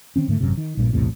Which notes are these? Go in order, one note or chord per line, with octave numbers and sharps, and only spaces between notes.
D#3 C4 C#4
G#2 D3 A3
G#1 F#2 C3
D#3
A#1 G2 A#2
B1 E2 A2 C3